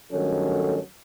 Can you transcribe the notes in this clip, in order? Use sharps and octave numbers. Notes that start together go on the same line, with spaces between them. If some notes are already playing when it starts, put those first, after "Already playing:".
G2 D#3 F#3 A3 C#4 A4